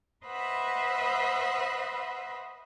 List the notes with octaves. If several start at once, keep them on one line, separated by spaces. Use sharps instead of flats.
B4 C5 D#5 E5 F#5 B5